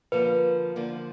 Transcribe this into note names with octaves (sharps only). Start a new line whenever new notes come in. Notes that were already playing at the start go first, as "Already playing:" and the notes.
D3 F3 A#3 B4
D3 F3 A#3